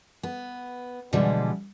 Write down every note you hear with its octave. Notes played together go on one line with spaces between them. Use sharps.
B3
B2 D3 E3 F3 G3 G#3